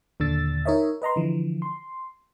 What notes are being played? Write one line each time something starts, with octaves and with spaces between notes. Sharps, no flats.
D#2 A#2 D3 D4 E6 A6
D#4 A#4 C#5 D#5 E5
B4 D#5 A#5 C6
D3 E3 F3
C6